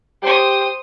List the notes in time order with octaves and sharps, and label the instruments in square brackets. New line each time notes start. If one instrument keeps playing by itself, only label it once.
[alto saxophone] G4 [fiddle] C5 D#6